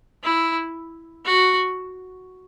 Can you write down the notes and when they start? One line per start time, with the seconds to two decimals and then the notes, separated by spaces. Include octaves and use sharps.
0.23 E4
1.25 F#4